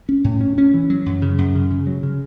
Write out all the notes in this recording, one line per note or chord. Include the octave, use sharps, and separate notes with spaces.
C#4
A2
C#4
C#4
E3
F#3
F#2
C#3
F#2
C#3
C#3
F#3
C#3